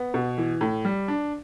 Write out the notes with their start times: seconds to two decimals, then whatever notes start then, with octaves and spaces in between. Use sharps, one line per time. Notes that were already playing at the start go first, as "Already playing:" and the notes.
Already playing: B3
0.14 B2
0.38 E3
0.61 A2
0.85 G3
1.08 D4